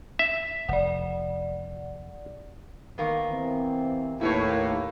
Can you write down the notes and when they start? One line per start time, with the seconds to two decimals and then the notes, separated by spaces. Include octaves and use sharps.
0.19 E5
0.69 F1 D5 F#5
2.98 D#3 A#3 B3
3.29 C3 E3 C4
4.21 D#2 A2 A#3 E4 B4 C#5